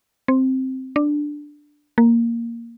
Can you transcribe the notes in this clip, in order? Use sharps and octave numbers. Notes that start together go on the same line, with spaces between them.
C4
D4
A#3